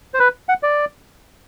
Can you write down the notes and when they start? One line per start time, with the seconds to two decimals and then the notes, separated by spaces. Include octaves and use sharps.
0.14 C5
0.19 B4
0.49 F#5
0.63 D5